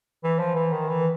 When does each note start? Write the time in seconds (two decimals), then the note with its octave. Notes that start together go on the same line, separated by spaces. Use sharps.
0.24 E3
0.39 F3
0.55 E3
0.72 D#3
0.88 E3